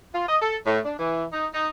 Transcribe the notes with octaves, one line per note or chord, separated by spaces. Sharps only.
F4
D#5
A4
A2
D4
E3
D#4
D#4